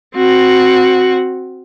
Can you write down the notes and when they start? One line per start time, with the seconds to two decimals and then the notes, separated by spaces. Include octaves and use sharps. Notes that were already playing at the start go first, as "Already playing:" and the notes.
0.16 C4 F#4